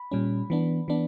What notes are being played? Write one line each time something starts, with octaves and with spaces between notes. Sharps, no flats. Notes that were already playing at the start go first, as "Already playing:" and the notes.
Already playing: B5
A#2 G3 C#4
E3 B3 D4
E3 B3 D4